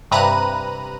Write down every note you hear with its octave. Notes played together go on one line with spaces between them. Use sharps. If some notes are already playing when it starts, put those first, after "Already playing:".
G2 C3 B4 A#5 F#6 D#7